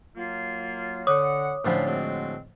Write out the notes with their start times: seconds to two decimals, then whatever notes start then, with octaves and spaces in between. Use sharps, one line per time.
0.16 F#3 A#3 F4
1.07 D3 C#5 F#5 D6 D#6
1.65 A2 D3 F3 C#4 C5 B5
1.87 G#3 C4 F#4